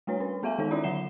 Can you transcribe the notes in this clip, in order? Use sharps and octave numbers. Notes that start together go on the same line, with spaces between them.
G3 A3 D4 B4 C#5
C#4 B4
A3 B3 A4 E5 F5 G#5
D#3 G#3 B3 D#4 A4 C5
C#4 E4 F4 D5 E5 A#5
D3 F#3 F#5 C7 E7 G7